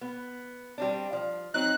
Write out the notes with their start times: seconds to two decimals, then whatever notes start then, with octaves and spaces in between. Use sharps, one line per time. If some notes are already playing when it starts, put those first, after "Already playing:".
0.01 B3
0.78 G3 C4 D4
1.13 F3
1.54 F#3 C4 D#4 F#6